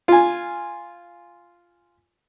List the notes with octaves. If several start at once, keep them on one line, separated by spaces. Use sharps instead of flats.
F4 G#5